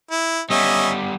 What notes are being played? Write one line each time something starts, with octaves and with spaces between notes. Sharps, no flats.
E4
G3 B3 C#4 D#5 E5